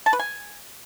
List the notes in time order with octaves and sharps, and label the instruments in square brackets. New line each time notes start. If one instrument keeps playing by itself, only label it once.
[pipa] A5
B4
G#5